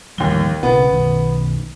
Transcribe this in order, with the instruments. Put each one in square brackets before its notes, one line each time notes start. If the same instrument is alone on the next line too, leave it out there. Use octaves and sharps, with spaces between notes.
[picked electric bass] A1 F3 G3 [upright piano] D#2 G7
[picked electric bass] B1 C#3 [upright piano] B3
[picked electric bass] B1 D#3